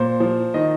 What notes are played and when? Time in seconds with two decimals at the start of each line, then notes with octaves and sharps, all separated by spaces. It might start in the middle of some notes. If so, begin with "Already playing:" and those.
Already playing: A#2 C5
0.20 F3
0.54 D#3 D#5